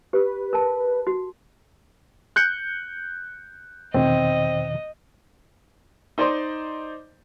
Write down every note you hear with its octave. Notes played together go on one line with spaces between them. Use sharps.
G4 B4
A#4 A5
F#4
F#6 G6 C#7
E2 B2 D#3 C4 D#5
D#4 C5 D5 D#5 C6